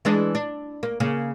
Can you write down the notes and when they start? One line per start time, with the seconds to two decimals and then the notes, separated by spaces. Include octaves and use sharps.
0.05 E3 G#3 D4
0.35 D4
0.83 A#3
1.00 C#3 A#3